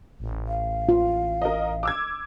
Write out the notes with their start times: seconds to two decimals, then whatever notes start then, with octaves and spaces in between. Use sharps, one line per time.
0.20 A1
0.48 F5
0.89 F4
1.42 A#4 D#5
1.83 D6 E6 G#6